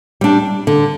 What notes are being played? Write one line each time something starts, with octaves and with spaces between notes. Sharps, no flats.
G3 D4
D3